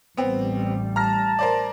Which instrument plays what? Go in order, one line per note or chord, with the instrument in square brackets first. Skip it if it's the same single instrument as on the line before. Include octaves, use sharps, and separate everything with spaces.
[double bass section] A1 G3 [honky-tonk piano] B3 C4
[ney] A5 [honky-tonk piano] A#5 F6 A#6
[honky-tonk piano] A#4 C5 D5